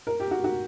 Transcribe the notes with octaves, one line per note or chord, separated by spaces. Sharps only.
A#4
G4
F#4
F#4